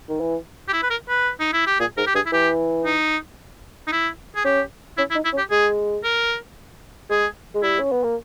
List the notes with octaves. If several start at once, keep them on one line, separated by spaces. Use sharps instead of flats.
D#3
E3
G4
E4
B4
A#4
B4
D#4
E4
G4
A#2 G#4
G#2 A#4
G4
G2 G#4
E4
E3 G4
D#4
D#4
E4
G#4
C#4 G4
C#4 E4
E4
D#4
E4
C#4
G4
G#3 G#4
A#4
G#3 G#4
G#3
G3 E4
C#4
B3
A#3